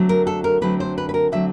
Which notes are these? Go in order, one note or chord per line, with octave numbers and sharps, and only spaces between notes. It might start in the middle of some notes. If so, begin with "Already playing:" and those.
Already playing: D3 F#3 A3 C4
A#4
A4
A#4
D3 F#3 A3 C4 B4
C5
B4
B4
A#4
D3 F#3 A3 C4 E5